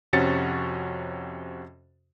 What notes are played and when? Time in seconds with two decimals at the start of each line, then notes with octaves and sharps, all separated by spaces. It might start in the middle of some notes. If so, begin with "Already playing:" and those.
0.13 F2 C3 C#4 F#4 A6 C#7